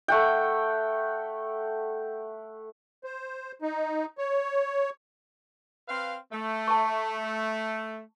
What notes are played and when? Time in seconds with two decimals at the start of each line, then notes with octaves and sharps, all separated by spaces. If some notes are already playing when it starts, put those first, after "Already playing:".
0.08 A3 F#5 G5
3.04 C5
3.62 D#4
4.18 C#5
5.88 C4 B4 F5
6.33 A3
6.68 A5 C#6